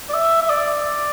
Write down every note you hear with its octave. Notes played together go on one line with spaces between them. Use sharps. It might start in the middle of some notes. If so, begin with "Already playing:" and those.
D5
E5
E5
D5